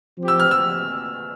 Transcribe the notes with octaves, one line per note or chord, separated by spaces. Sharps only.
F3 C4 G4
E6
F6
E6